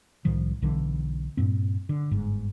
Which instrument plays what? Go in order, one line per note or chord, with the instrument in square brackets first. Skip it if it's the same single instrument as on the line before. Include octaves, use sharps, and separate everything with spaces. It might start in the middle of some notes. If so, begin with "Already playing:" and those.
[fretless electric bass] C2 A2 D#3 F3
B1 D3 E3
G2 A#2 C4
D3
G1 G#2